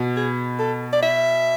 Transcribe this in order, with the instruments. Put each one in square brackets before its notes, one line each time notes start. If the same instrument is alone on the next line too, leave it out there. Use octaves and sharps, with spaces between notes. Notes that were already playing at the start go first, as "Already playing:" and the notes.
Already playing: [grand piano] B2
[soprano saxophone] G#4
A4
D5
E5